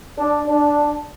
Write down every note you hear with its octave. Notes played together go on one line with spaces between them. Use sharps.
D4
D4